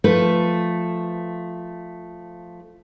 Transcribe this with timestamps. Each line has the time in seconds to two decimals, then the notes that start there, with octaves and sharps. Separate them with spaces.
0.04 F3 A3 B4